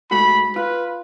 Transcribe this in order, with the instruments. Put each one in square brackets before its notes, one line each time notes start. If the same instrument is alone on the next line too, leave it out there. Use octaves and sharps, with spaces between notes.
[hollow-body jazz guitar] G#2 A3 F#4 [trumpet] B5
[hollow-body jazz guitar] F4 [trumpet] B4